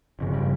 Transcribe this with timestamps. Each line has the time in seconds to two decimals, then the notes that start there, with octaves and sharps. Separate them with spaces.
0.19 G1 F2 C#3
0.33 G3